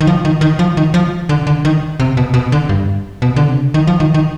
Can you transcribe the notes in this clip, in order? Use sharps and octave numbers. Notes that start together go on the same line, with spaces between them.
D#3
F3
D#3
D#3
F3
D#3
F3
D3
D3
D#3
C3
B2
B2
D3
G2
B2
D3
C3
D#3
F3
D#3
D#3